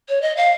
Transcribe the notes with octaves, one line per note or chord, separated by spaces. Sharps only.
C#5
D#5
F5